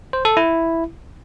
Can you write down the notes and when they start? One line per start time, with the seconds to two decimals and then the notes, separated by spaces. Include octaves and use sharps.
0.13 C5
0.25 A4
0.37 E4